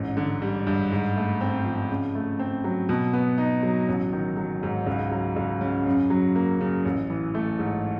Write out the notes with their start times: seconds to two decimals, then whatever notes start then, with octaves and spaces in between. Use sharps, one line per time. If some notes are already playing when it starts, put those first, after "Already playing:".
Already playing: A1 G#2
0.17 D3
0.42 G3
0.67 G2
0.91 G#2
1.16 A3
1.41 C4
1.66 F3
1.90 C#3
2.15 A3
2.39 C4
2.64 F#3
2.89 B2
3.13 B3
3.38 D#4
3.63 F#3
3.88 A1
4.13 D#3
4.37 F#3
4.63 G#2
4.87 C#2
5.11 F#3
5.36 C#2
5.61 C#3
5.86 F#2
6.10 F#3
6.36 A#3
6.60 C#3
6.85 A1
7.10 E3
7.35 A3
7.59 G#2